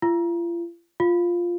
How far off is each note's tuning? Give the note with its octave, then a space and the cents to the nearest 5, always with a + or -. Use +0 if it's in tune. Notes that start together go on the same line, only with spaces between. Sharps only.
F4 -40
F4 +0